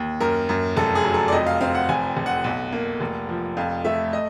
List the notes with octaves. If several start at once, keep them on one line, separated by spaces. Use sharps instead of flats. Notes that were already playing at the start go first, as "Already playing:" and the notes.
Already playing: D#2
F#2 A#4
F#2
F1 A4
G#4
F#3
A4
D5
F2 D#5
F5
C4 F5
F#5
F1 G#5
F1
F#5
B1
A#3
F1
F3
F2 F5
A3 E5
D#5